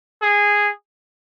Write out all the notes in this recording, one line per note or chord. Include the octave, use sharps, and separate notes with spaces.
G#4